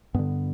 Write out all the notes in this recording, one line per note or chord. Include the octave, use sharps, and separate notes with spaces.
G2 D3 B3